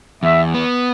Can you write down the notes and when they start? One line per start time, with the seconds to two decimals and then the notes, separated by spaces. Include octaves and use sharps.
0.23 E2 E5
0.54 B3